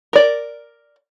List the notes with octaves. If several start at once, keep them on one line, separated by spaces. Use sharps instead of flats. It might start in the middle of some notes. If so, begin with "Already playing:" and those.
A#4 D5